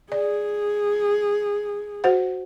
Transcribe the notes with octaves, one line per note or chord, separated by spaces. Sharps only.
G#4 D5
F#4 C5 F#5